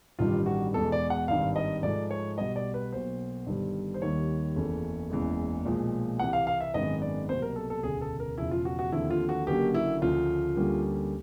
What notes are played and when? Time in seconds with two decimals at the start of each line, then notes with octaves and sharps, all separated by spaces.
0.19 A1 G2 D#3 G3 F4
0.46 F#4
0.74 E2 B2 G#3 A4
0.92 D5
1.10 F#5
1.28 G#1 G2 D#3 F5
1.56 D#5
1.83 G#2 F3 A3 D5
2.11 C#5
2.38 B1 B2 G3 B3 D#5
2.56 D5
2.74 B4
2.92 B1 B2 F#3 A#3 C5
3.46 G1 G2 D#3 G3
3.94 C5
4.02 D#2 D#3 G3 C#5
4.56 F#1 E2 C#3 E3 A3
5.10 F#1 E2 C#3 E3 G#3
5.65 B1 A#2 F3 G#3
6.19 C2 C3 E3 F#5
6.33 F5
6.47 F5
6.60 E5
6.74 G#1 F#2 D#3 G#3 B3 D#5
7.02 D5
7.29 C2 B2 F#3 A#3 C5
7.42 A#4
7.56 A4
7.70 A4
7.83 E1 D2 C#3 G#4
8.02 A4
8.20 A#4
8.38 E1 E2 C#3 F3 E4
8.51 F4
8.65 F#4
8.79 F#4
8.92 D#2 D3 F3 A3 C4 E4
9.10 F4
9.29 F#4
9.47 F#1 F#2 D3 F#3 A#3 G4
9.74 E4
10.01 D2 C#3 F3 F4
10.56 D2 D3 G3 A#3 C#4